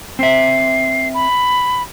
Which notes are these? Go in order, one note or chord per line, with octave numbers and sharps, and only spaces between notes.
C4 E5 C7
B5